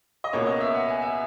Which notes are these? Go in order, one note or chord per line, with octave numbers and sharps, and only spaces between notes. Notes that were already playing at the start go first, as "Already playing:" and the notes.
D#5
C#2 B2 A#3 C#5
D#5
E5
F#5
G#5
E5